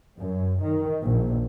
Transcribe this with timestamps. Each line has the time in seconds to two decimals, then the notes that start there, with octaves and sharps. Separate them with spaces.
0.17 F#2
0.62 D#3
1.04 A#1